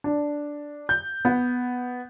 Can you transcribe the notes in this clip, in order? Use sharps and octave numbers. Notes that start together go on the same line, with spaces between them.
D4
G6
B3